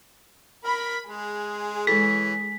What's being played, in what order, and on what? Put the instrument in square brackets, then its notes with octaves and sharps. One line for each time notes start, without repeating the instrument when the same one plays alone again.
[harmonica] A#4 [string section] B5
[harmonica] G#3 [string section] G#4
[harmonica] E3 C#5 [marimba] G#3 A4 [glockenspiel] B6